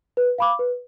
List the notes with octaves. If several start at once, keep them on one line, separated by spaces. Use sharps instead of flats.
B4
F5 B5 D6
B4